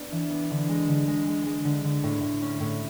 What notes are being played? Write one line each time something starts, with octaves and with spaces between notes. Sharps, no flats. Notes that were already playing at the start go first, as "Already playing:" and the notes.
Already playing: B3 D4
E3
B3
D3
G#3
D3
G#3
G#3
G#3
D3
D3
A2
A2
C#4
A2